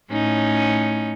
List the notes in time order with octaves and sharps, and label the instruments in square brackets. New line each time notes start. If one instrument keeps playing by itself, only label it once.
[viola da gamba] A2 C#4 D#4